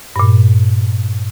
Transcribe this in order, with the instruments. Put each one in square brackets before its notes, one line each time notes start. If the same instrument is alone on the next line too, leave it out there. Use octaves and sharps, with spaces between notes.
[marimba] G2 A#2